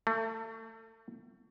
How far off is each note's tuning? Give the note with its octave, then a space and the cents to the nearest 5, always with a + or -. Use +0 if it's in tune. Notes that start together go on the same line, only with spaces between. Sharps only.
A3 +35